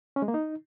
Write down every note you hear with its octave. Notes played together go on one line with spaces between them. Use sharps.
C#4
G#3
A#3
D#4